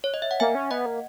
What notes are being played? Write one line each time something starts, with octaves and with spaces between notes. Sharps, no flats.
C#5
D#5
E5
F#5
A#3 E5 G#5
C#4
B3 D#5 F#5
A#3